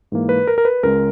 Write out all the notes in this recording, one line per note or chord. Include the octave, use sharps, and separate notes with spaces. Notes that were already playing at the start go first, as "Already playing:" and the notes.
G#2 E3 A#3
B4
A#4
A#4
B4
C#2 C#3 G#3 A#4